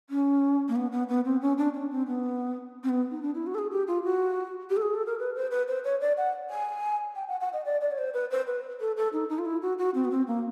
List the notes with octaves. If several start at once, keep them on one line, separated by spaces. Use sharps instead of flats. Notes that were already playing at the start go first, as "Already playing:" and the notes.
C#4
A#3
B3
B3
B3
C4
C#4
D4
C#4
C4
B3
C4
B3
D#4
D4
E4
F#4
A4
G#4
G4
F4
F#4
G4
A4
G#4
A4
A#4
B4
C5
B4
C5
C#5
D5
F#5
G#5
G5
F#5
F#5
D#5
D5
D5
C#5
C5
B4
C5
B4
A4
A4
D#4
D#4
F4
E4
F#4
F#4
C4
B3
C4
A#3